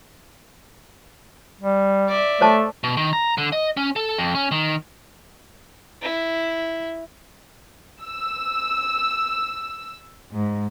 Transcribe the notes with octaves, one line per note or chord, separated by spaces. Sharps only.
G3
D5 E5
A3 C5 C#5 A5
B2
D#3
A#5
D3
D#5
C#4
A4
F2
C#4
D#3
E4
E6
G#2